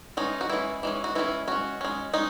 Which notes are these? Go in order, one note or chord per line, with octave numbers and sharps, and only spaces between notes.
E3 G#3 C#4 D#4
F#4
E3 G#3 C#4 E4
E3 G#3 C#4
F#4
E3 G#3 C#4 E4
G#3 C#4 F#4
G#3 C#4
G#3 C#4 D#4